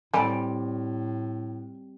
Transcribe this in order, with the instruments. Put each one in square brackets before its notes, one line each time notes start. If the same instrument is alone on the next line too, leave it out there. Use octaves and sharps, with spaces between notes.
[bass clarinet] A2 [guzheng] G3 C4 D5 [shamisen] A4 G#5